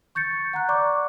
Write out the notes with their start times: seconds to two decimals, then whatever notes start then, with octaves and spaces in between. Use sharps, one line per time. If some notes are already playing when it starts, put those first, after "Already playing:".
0.15 C#6 G6 A6 C#7
0.54 F#5 A#5 F#6
0.69 D5 A#5 C#6 D6